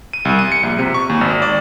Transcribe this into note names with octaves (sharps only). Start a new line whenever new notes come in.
D#7
C2
D#7
C#7
A#1
C3
C#6
D#2
G#1
D5